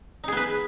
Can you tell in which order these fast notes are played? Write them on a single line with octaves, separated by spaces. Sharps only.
D#4 G#4 B3 B4